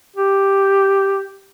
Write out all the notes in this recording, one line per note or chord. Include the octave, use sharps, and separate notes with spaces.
G4